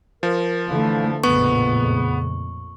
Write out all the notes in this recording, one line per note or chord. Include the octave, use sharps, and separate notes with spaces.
F3 A#4
D3 E3 A3 E4 B4 F5
A#1 F2 A2 C#3 B3 C#6